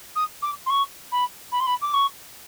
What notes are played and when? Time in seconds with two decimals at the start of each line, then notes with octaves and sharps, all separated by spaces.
0.15 D#6
0.42 D6
0.66 C6
0.70 C#6
1.12 B5
1.52 B5
1.60 C6
1.66 B5
1.81 D6
1.93 C#6